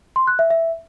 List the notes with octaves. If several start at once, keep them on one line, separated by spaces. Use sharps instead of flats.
C6
F#6
E5
E5